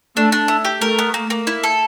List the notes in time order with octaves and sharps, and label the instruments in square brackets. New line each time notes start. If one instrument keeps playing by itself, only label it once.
[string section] A3 [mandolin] D4
[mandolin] D4
E4
G4
[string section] A3 [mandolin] A#4
[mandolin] B3
A#3
A#3
E4
A4